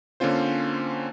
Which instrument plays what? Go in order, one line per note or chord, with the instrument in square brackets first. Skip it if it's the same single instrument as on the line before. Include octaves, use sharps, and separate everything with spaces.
[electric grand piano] D3 A#3 C4 C#4 F4 C5